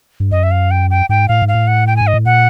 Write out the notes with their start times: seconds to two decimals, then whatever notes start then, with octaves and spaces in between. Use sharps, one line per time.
0.20 G2
0.31 F#2 D#5
0.43 E5
0.51 F5
0.71 G5
0.90 G5
1.09 G#2 G5
1.28 A2 F5
1.42 G#2
1.48 F5
1.55 A2
1.67 F#5
1.87 G5
1.96 G#2 G#5
2.07 D#5
2.14 A2
2.26 A#2 F#5